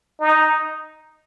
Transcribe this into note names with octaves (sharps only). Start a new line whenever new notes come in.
D#4